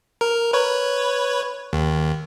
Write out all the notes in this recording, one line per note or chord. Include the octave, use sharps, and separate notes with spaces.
A#4
B4 C#5
D#2